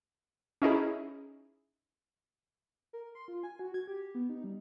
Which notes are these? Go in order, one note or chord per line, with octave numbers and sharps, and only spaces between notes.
C#4 D#4 E4 G#4
A#4
C6
F4
G#5
F#4
G#6
G4
B3
D#4
G3